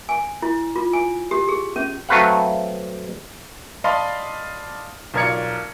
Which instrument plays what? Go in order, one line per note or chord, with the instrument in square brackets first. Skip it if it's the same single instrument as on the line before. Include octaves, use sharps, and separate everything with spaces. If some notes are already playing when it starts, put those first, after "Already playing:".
[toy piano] G#5
E4
F4
G#5
G4
G#4
C#4
[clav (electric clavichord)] F#3 A3 C4 B4 F5 F#5
[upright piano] D5 D#5 F5 A5 B5 C6
B1 F4 A#4 D5 G#6 C#7